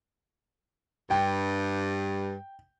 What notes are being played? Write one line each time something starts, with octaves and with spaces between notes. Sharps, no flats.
G2 G5